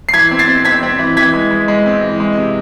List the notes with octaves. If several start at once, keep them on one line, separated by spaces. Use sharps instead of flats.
C7
E3 G#6 B6
C4
A6 C7
C4
C4 G#6 B6
C4
E3
E3 G#6 B6
G#3
G#3
G#3
C4
E3
G#3
C3